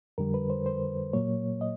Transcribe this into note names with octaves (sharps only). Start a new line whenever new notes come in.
F2 D3 G3 A#4
B4
C5
C5
A#2 F#3 A#3 C#5
D#5